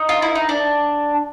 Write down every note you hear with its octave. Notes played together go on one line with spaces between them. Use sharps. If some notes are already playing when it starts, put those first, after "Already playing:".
Already playing: D#4
F4
E4
D#4
D4